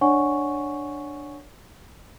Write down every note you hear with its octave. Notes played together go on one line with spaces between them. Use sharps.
D4 C#5 D5 F#5 G#5 C#6